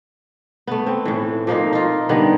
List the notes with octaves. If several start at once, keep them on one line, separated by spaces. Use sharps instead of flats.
A3 B3
C4
A2 E3
A#2 F3 A#3 D#4
D#4 F4
D3 D#3 G3 B3